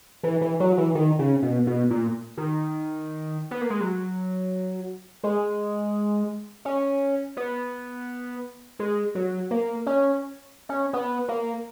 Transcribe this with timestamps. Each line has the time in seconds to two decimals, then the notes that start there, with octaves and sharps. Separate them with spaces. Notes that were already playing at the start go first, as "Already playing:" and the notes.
0.23 E3
0.41 E3
0.60 F#3
0.78 E3
0.95 D#3
1.19 C#3
1.42 B2
1.67 B2
1.90 A#2
2.37 D#3
3.51 B3
3.61 A#3
3.70 G#3
3.81 F#3
5.24 G#3
6.65 C#4
7.37 B3
8.79 G#3
9.15 F#3
9.51 A#3
9.86 C#4
10.69 C#4
10.93 B3
11.28 A#3